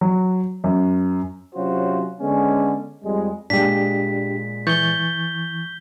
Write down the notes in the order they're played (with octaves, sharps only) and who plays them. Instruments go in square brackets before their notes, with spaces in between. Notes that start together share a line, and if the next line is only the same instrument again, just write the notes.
[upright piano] F#3
F#2
[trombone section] C3 F#3 C#4 F4 F#4 C5
D3 G#3 B3 C#4
F2 G3 G#3
[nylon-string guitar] A#2 G#3 [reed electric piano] D4 G4 [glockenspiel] B6
[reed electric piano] E3 C#6 A6 [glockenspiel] G6 G7